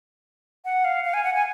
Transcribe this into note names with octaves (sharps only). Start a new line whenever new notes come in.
F#5
F5
F5
G#5
F#5
G#5